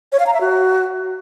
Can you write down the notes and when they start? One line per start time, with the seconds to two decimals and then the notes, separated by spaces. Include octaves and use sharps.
0.12 C#5
0.19 F5
0.26 A#5
0.34 E5
0.41 F#4